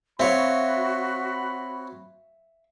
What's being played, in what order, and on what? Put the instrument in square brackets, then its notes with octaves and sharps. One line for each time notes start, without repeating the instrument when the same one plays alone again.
[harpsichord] C4 C#5 [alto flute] F#4 [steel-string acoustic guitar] E5 F5 [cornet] B5